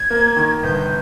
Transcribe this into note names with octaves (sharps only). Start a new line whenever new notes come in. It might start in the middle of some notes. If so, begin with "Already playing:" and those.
Already playing: G#6
A#3
D#3
G1 G6